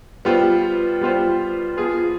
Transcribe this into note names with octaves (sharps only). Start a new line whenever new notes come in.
G3 B3 F4 C5
G3 B3 F4 C5
F3 B3 F4 G#4